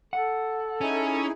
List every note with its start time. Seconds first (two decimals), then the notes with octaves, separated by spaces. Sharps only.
0.13 A4 F#5
0.81 C#4 D#4 E4 G#4